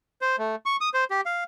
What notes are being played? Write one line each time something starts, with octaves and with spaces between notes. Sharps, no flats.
C5
A3
C#6
D#6
C5
G4
F5